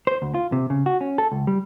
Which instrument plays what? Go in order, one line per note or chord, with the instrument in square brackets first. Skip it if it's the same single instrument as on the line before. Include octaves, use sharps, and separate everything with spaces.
[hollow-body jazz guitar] C5
D2
F4
C3
C#3
F#4
C#4
A4
C#2
G3